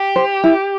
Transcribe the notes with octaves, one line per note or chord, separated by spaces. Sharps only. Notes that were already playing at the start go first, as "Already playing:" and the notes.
Already playing: G4
C5
E4